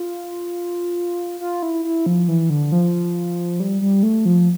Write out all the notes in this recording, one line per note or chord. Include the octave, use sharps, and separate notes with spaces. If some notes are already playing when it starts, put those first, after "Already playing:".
Already playing: F4
F4
E4
E4
F3
E3
D3
F3
G3
G3
A3
F3